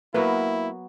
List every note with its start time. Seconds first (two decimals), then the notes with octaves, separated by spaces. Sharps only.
0.14 F#3 A#3 B3 E4 B4